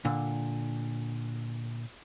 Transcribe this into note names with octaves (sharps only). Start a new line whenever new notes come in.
A#2 D3